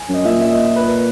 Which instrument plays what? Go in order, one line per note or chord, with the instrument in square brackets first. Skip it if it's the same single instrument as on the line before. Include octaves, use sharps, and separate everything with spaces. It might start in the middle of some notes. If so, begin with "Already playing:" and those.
Already playing: [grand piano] G#5
[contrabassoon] F#2 [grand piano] D#5
[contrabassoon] A#2 [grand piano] E5
[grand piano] E5
D#5
B4